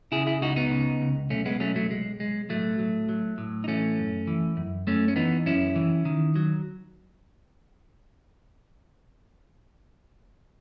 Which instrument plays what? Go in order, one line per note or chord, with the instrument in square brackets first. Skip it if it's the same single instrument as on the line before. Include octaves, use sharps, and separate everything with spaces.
[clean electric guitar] C#3 E4 G#4
E4 G#4
C#2 D#4 F#4
B3 D#4
C#3
C#2
B1 A3 C#4
G#3 B3
F#3 A3 C#4
F#3 A3
B1 G#3
B1 G#3
A2 F#3 A3
F#3
F#3
A2
D#4
E3 A3 C#4
F#2
E3
F#2
F#2 A3 C#4
C#4
E3 B3 D#4
F#2 C#4 E4
E3
D#3
F#3